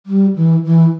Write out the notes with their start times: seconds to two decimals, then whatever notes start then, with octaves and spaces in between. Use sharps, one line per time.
0.06 G3
0.36 E3
0.65 E3